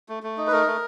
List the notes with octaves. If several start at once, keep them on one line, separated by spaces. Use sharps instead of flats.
A3
A3
D#4
B4
A3 A#4
A3